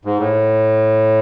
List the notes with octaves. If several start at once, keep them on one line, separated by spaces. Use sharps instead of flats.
G#2
A2